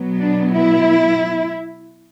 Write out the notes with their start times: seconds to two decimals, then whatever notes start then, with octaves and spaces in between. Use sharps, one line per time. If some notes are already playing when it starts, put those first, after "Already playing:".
Already playing: B2 F#3 B3
0.19 D4
0.52 E4